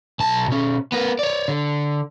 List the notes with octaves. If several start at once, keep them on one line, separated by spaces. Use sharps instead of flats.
B1 A5
B2 C#4
B3 A#4
C#5 D5
D3